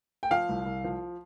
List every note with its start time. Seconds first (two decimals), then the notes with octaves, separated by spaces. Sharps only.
0.23 G5
0.31 F3 F5
0.49 C2
0.66 C2
0.84 F3